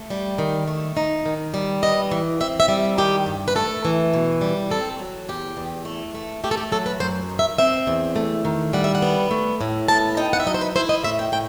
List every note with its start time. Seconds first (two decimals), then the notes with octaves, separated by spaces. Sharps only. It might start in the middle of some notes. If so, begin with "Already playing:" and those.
Already playing: A3
0.10 G3
0.38 D#3
0.67 A3
0.97 D#4
1.26 D#3
1.54 G3
1.82 B3 D#5
2.11 E3
2.40 C4 E5
2.60 E5
2.68 G3
2.98 D#3 G4
3.26 G2
3.48 B4
3.55 A3 A4
3.85 E3
4.13 B2
4.41 G3
4.70 C4 A4
4.99 F#3
5.29 E2 G4
5.57 E2
5.85 A3
6.14 A3
6.44 A3 G4
6.51 A4
6.57 G4
6.72 F#3 A4
6.86 B4
7.00 F#2 C5
7.29 D#3
7.39 E5
7.58 C4 E5
7.87 E2
8.16 A3
8.45 D#3
8.73 G3 F#5
8.84 E5
8.95 F#5
9.02 B3
9.31 A3
9.61 A2
9.88 B3 A5
10.17 D#4 G5
10.33 F#5
10.40 E5
10.46 F#3 D#5
10.54 C5
10.61 B4
10.76 E4 C5
10.89 D#5
11.04 A2 E5
11.19 G5
11.32 A2 G5